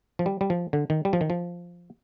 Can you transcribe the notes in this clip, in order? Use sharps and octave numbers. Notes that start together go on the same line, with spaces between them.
F3
G3
G3
F3
D3
D#3
G3
F3
D#3
F3